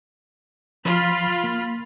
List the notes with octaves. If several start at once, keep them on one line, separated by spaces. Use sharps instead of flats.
F3 F4 B5
A#3